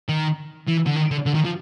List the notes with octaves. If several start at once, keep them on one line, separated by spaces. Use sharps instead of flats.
D#3
E3
D3
D#3
D3
D3
D#3
F3